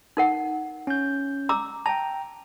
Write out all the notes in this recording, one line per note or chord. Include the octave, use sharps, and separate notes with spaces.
D#4 A#4 F#5
C#4 G6
A#5 D6 E6
G5 A5 A#5